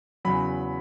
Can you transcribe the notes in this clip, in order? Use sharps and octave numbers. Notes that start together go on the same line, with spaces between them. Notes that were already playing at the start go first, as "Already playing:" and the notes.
E2 C#3 F#3 B5